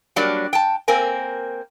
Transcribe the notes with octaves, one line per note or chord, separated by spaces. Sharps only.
F#3 G3 A#3 D4 G4 D5
G5 A5
A#3 C4 A#4 G#5